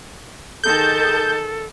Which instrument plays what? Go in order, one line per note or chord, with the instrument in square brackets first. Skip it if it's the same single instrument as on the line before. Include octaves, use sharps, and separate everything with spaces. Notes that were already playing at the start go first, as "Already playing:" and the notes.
[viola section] D#3 G#4 A5 [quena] A4 [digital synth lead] G6